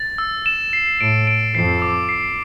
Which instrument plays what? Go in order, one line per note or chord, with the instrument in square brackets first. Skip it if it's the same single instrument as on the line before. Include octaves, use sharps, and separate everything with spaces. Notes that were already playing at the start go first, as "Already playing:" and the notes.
Already playing: [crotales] A6
E6
E7
C7
[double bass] A2 [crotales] D7
[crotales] D7
[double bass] F2 [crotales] C7
[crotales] D6
C7